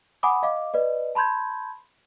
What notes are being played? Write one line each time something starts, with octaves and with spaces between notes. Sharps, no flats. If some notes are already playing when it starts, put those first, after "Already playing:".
F#5 G#5 B5 D6 D#6
D#5 F5 D6
B4 D5 D#5
A5 B5 C6 G6 G#6